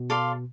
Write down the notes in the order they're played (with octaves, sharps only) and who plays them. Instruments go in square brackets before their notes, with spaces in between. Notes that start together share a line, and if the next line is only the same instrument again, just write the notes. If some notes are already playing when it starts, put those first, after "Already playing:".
Already playing: [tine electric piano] B2
[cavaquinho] A4 D5 F5 C6